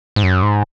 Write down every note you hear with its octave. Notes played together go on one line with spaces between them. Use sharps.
G#2
F#2
G#2